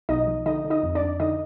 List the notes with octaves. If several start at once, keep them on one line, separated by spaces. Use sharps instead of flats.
B1 D#4 D#5
F3
D3 D#4 D#5
D3
D#4 D#5
F2
D4 D5
F2
D3 D#4 D#5